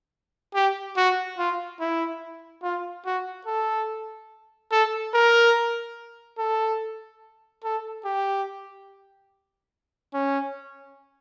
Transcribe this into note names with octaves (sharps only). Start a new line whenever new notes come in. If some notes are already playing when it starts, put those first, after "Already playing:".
G4
F#4
F4
E4
F4
F#4
A4
A4
A#4
A4
A4
G4
C#4